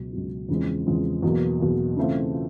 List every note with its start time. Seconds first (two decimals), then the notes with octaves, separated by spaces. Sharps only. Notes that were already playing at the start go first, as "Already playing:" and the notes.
Already playing: C#2 B2 F#3
0.13 C#2 B2 F#3
0.49 E2 C#3 F3 G#3 C4
0.86 E2 C#3 F3 G#3 C4
1.23 E2 B2 F#3 A#3
1.60 E2 B2 F#3 A#3
1.97 C#3 E3 A3 C4 F4
2.33 F4